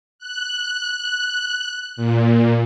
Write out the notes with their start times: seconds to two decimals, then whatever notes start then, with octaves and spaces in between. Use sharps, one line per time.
0.19 F#6
1.96 A#2